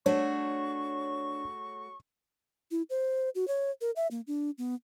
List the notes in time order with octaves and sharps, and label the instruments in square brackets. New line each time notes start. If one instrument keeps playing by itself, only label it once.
[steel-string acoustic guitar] A3 F#4 G#4 [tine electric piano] D4 [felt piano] C#5 [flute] C#6
[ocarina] E4
C5
F#4
C#5
A#4
E5
A#3
D4
B3